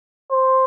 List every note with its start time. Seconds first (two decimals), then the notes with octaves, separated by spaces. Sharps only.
0.32 C5